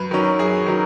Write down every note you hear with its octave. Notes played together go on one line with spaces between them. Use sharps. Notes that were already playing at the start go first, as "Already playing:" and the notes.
Already playing: F#2 B4
D#3 F#3 C#4
F#2 G#4
D#3 F#3 C#4